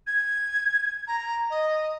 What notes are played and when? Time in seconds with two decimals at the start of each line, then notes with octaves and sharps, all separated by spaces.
0.07 G#6
1.07 A#5
1.50 D#5